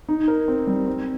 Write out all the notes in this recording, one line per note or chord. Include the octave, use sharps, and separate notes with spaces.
D#4
A#4
C4
G3
C4